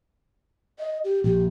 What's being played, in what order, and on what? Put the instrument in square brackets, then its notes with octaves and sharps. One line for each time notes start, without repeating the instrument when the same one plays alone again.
[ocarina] D#5
G4
[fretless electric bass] A#1 [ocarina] G4